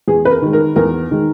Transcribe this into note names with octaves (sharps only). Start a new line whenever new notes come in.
E2 G#4
B4
A#4
D#3 G#3
A#4
E2 A#4
D#3 G#3